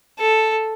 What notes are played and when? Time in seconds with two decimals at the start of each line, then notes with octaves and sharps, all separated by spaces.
0.19 A4